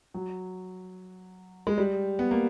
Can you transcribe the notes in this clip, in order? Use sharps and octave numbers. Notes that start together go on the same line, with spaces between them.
F#3
G#3
G3
B3
A#3